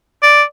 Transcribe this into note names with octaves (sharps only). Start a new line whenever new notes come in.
D5